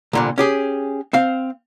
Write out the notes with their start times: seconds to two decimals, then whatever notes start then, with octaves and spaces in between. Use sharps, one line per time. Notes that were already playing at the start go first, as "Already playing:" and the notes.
0.13 C2 A#2 D3
0.38 C#4 G4 G#4
1.13 C4 F5